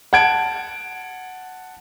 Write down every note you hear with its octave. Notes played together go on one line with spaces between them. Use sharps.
F#5 A5 G#6 D7